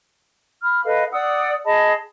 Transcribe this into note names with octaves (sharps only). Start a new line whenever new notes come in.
B5 F6
A4 B4 D#5 F5
D5 F#5 D#6 E6
G#4 D#5 A5 B5